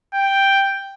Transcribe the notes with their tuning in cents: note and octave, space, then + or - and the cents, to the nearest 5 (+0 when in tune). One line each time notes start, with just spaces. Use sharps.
G5 +0